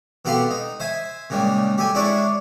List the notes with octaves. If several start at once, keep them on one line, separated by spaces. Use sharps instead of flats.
B2 B3 G4 A4 F5 C6
D#4
C5 E5 G#5
A#2 C#3 G3 G#3
G4 A4 G#5
G#3 D4 E4 C#5 D5